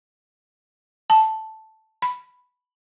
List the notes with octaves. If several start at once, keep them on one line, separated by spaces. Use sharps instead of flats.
A5
B5